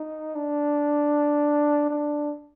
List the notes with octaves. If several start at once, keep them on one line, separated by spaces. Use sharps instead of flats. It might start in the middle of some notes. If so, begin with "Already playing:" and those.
Already playing: D#4
D4
D4